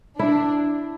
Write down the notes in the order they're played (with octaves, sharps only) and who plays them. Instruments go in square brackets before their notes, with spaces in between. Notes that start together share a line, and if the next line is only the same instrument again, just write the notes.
[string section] D4 [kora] E4